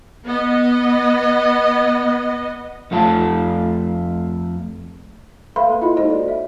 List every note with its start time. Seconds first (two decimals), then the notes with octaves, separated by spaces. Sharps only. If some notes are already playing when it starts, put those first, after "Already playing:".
0.25 B3 D#5
2.91 F2 A3 F4 G#5 A5
5.56 A4 B4 E5 F5 B5 C6
5.69 A#3 G#4
5.81 E4 F4 D#5 B5
5.97 G#3 D#4 F#4 A4 C5 D#5
6.10 D5
6.28 E5